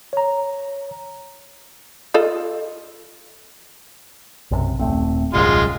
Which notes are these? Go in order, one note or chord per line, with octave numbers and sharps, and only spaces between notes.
C#5 A#5
F4 A4 D#5
B1 F#2 C3
D#1 A3 C4
D#1 C2 F#2 G#3 F4 C6